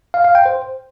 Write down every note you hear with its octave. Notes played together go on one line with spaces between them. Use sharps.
F5
F5
G5
C5